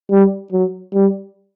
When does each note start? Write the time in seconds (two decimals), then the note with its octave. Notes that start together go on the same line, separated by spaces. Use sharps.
0.11 G3
0.52 F#3
0.94 G3